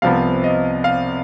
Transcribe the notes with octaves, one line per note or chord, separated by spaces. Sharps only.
C2 C3 F3 B3 F5
D#5
F5